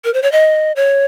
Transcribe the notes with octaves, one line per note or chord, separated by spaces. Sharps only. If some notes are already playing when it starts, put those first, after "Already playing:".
A#4
C5
C#5
D#5
C#5